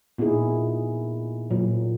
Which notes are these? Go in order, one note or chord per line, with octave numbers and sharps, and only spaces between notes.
A#2 B3 D#4 E4 G#4
A#2 F#3